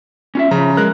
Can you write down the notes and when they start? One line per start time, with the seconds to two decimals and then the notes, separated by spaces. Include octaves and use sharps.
0.35 C#4 F4 E5
0.51 C#3 F3 A#5
0.77 G#3 A#4 F#6